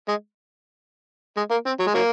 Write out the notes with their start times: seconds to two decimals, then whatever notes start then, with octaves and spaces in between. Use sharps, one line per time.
0.09 G#3
1.37 G#3
1.51 A#3
1.66 C4
1.80 F#3
1.87 G#3
1.94 F#3 A#3